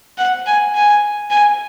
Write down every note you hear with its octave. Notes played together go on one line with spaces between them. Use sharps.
F#5
G#5
G#5
G#5